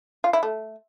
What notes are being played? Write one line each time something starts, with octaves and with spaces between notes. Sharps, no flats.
F4
E4
A3